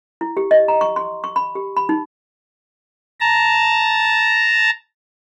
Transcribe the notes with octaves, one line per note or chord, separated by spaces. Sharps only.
E4
G4
D#5
A#5
C#6
C6
C#6
B5
G4
B5
D#4
A5 A#5